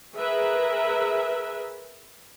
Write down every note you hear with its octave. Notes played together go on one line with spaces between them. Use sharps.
G#4 A#4 B4 E5